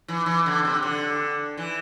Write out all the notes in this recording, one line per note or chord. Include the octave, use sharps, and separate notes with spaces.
E3
E3
D3
C3
D3
E3